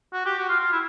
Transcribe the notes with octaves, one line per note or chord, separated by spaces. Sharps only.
F#4
G4
F#4
F4
F4
E4